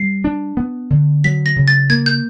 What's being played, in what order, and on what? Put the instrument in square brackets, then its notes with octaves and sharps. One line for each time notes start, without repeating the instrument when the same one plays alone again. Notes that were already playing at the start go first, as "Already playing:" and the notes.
Already playing: [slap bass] G3 [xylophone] C7
[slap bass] D4
B3
D3
[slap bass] F#3 [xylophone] B6
[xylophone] A#6
[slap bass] C#3
[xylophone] A6
[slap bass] A#3 [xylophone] G#6
[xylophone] G6